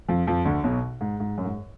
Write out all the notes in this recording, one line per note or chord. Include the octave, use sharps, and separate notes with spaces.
F2 F3
F2 F3
D2 D3
B1 B2
G#2
G#2
F#2
G#2